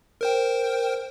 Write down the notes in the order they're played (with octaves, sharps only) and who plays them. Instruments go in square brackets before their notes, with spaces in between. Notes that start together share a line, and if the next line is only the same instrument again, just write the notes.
[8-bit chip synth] A#4 C5 G5